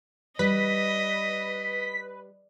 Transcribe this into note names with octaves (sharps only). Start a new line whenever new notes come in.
G3 B4 D#5 B6